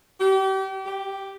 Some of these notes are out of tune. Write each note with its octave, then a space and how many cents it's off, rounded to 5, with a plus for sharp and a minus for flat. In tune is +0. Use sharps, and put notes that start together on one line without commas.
G4 -35
G4 +0